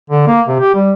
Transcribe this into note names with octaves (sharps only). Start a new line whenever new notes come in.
D3
A#3
C3
G4
G3